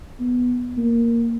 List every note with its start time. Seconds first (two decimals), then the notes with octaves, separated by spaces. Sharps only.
0.20 B3
0.77 A#3